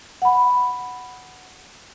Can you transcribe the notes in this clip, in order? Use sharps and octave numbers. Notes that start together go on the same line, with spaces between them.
F#5 B5